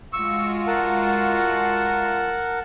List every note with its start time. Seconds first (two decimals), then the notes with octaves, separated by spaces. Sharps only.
0.13 G#3 F4 F#4 C#6 E6
0.67 A#4 F#5 A5